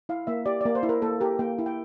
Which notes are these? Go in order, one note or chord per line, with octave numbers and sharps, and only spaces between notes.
E4 F5
A#3 E5
G4 D5
A#3 D5
C5
E4
A#4
A#3 A4
G4 A#4
A#3 G5
E4
G5